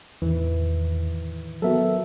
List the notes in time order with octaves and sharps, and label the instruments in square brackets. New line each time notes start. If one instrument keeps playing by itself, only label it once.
[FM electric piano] E2 [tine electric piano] A2 D#3 E3
[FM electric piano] F#3 B3 F#4 [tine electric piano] A4 A#4 E5